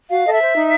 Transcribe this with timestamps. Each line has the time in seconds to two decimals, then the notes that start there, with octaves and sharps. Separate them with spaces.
0.10 F#4 F5
0.25 A4 D#5
0.32 E5
0.41 C5
0.56 D#4